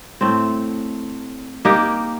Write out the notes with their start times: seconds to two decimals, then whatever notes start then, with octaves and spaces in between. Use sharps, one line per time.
0.21 A2 A3 C4
1.65 A#3 D#4 G4